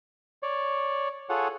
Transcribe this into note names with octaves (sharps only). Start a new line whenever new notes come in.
C#5 D5
F4 G#4 A4 C#5 F#5